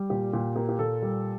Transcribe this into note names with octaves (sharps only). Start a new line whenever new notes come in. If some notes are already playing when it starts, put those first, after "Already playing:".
Already playing: G3
A#2 G4
A#2 G4
A#3 G4
G4
A#2 A4
G3